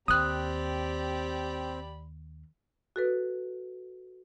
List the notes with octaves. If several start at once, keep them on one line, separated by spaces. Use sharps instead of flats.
D#2 C4 G4 D5 B5 D#6 F#6
F#4 A4 B4